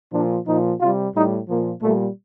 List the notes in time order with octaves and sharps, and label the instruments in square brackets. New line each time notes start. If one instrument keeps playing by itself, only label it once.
[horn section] A#2 F3 D4
A#2 F3 D#4
C3 G3 F4
A2 G3 D#4
A#2 F3 A#3
A#2 G3 A3